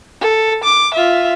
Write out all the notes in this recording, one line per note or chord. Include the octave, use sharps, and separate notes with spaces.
A4
D6
F4 E5